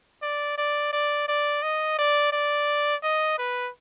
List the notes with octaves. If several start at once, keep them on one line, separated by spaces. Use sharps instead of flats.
D5
D5
D5
D5
D#5
D5
D5
D#5
B4